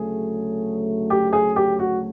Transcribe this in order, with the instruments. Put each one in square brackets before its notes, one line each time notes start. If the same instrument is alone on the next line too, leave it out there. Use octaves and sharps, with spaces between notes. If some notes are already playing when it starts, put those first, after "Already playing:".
Already playing: [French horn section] D2 C#3 F#3 A3 [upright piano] G#4
[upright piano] G4
G#4
G4
F#4